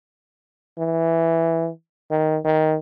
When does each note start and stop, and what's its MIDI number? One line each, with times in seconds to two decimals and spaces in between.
0.78 1.70 52
2.11 2.38 51
2.45 2.76 51